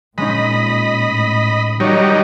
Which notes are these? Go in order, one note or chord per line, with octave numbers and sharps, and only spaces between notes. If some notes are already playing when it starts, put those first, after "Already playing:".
A#2 G#3 C#4 D#4 D#5 B5
A2
D#3 F#3 G3 D#4 C#5 D#5